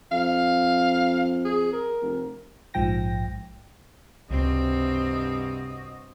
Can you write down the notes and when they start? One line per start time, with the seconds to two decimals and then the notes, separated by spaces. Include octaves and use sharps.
0.12 F2 F5
1.45 G#4
1.73 A#4
2.02 F1
2.74 A#1 G#2 F3 G5 A#6
4.30 C#2 G2 C3 C4 F#4 C#5 D#5